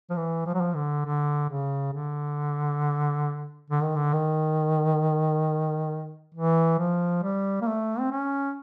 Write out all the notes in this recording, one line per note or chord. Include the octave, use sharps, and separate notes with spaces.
F3
E3
F3
F#3
F3
D3
D3
C#3
D3
D3
D#3
D3
D#3
E3
F3
G3
A#3
A3
C4
C#4